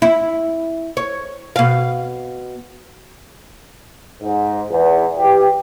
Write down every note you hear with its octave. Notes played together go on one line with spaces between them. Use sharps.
E4
C#5
B2 F5
G#2
E2
E3 G4